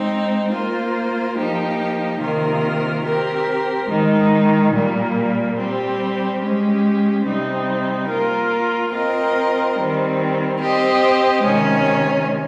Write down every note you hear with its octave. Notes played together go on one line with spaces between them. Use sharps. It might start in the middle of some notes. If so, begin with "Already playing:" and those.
Already playing: G#3 C4 D#4
A#3 F4 C5
F3 A#3 D#4 G4
C3 D#3 A#3 F4 A#4
C4 G4 A#4
D#3 G#3 D#4
A#2 G3 A#3
G3 C4 G4
G#3 C#4 G4
C3 G3 C4 D#4
A#3 F4 A#4
C4 F4 A#4 D#5
D#3 G3 C4
C4 G4 C5 D#5
C3 D#3 G#3 C#4